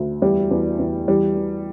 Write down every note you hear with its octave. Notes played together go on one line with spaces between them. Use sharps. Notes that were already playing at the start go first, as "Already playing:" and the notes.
Already playing: D2
E2 G3
E2
E2
E3 G3
E3